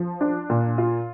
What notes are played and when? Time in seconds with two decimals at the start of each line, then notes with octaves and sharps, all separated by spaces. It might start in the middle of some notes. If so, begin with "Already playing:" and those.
Already playing: F3
0.21 D4
0.50 A#2
0.78 F4